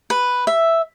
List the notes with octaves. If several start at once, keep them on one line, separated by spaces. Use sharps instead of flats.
B4
E5